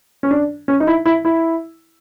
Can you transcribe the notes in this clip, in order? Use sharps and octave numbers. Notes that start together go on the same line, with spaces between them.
C#4
D4
C#4
D#4
E4
E4
E4